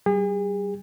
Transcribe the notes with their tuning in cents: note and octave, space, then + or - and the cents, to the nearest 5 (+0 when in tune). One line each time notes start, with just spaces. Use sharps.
G3 -35 G#4 -40